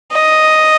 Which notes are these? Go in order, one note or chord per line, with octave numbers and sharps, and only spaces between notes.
D#5